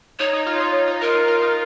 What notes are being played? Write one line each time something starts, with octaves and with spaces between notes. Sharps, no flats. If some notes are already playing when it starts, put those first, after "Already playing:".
D#4 C#5
D#4
F4
D#4
D#4
D#4
F4 A#4
D#4
F4
D#4